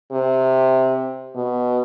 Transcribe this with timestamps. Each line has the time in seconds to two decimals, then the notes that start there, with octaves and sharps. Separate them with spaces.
0.12 C3
1.36 B2